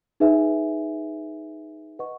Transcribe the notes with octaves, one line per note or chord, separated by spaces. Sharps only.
D#4 G#4 B4 E5 G#5
B4 D#5 F#5 C#6